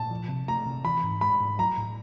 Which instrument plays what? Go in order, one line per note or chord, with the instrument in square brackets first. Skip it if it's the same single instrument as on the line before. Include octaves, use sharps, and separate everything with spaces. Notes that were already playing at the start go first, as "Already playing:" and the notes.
Already playing: [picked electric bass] A#2 [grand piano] A5
[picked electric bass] F3
C3
[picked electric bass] A3 [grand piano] A#5
[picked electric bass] C3
[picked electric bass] E3 [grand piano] B5
[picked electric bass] G#2
[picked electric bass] G#3 [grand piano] B5
[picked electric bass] G#2
[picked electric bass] F#3 [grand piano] A#5
[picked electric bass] A2